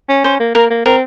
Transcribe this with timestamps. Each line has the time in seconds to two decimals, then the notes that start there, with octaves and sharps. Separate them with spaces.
0.09 C#4
0.24 C#4 C5
0.39 A#3
0.55 A#3 A#4
0.70 A#3
0.85 C4 A#4